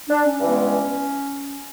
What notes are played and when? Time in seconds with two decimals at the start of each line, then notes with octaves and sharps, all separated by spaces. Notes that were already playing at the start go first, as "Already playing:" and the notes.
0.09 D4
0.24 C#4
0.39 G2 E3 G#3 B3